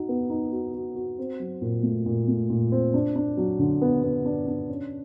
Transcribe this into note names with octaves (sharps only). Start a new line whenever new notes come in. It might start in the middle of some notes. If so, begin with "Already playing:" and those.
Already playing: D#4 F#4
B3
D#4
F#4
F#4
F#4
C4
F#3
A#2
A3
A#2
A3
A#2
C4
D4
D4
F#3
D3
B3
B3
D4
D4
C#4